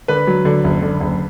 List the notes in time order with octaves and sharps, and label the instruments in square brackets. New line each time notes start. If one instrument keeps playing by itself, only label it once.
[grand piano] D3 B4
F#3
D3
F#1
D3
F#1